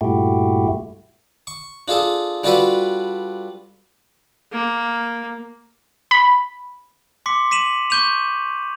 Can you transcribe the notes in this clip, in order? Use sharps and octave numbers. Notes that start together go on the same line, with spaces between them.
G2 A#2 A3 E4 F#4 G4
C#6
D4 F4 G#4 A4
G3 D4 F4 F#4 A4 B4
A#3
B5
C6 D6 B6 C#7
B6 D#7 E7 F#7
C#6 D6 G6 D#7 F7